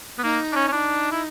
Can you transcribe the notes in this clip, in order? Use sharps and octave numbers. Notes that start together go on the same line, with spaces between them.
B3
A#3 D#4
D4
C#4
C#4
D4 D#4 E4
E4